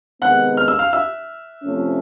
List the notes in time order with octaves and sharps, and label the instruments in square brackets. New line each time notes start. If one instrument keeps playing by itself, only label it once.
[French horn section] C3 D#3 G#3 B3 [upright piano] F#5 F#6
[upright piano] F6
E6
F5 F6
E5 E6
[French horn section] F2 C3 F3 A3 C#4